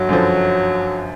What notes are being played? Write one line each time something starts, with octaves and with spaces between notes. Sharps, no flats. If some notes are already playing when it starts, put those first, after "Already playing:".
Already playing: G1 F#3
F#2 D3 F3